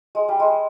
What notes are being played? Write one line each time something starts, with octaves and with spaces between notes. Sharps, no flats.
G#3
G3
G#3